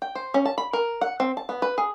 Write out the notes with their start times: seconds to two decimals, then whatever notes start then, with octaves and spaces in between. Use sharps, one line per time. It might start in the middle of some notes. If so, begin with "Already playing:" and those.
0.02 G5
0.15 C5
0.34 C#4
0.46 A5
0.58 B5
0.73 A#4
1.01 F#5
1.20 C4
1.37 A5
1.49 B3
1.62 B4
1.78 G#4